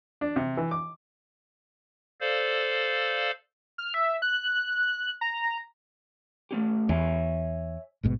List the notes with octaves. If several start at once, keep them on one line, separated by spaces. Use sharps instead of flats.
D4
C3
E3
D6
A4 C5 D5 F5
F6
E5
F#6
A#5
A3 C#4 G4
E2 C#5 E5 G#5
A1 G#2 B2